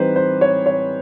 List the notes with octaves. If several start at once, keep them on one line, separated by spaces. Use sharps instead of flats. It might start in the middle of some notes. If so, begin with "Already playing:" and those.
Already playing: E3 G3 C4 D#4 B4 C5
C5
C#5
C#5